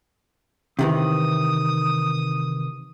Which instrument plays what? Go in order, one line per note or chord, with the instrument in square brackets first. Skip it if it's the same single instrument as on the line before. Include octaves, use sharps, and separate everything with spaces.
[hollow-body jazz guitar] C3 D#3 E3 [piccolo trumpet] D#6